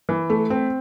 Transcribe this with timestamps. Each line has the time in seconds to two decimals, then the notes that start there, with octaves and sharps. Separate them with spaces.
0.09 E3
0.30 A3
0.50 C4